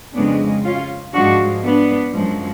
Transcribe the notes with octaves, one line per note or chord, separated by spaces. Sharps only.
F2 C#3 G#3 B3 D4
C#4 F4
G#2 F3 G#3 D4 F#4
B3 D4
F#2 F3 G#3